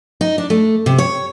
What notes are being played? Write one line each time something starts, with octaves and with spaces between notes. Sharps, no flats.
D#4
D4
A3
C3
C#5